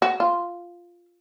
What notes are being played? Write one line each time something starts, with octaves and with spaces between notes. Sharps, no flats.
F#4
F4